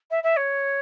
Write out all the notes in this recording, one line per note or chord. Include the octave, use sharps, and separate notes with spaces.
E5
E5
C#5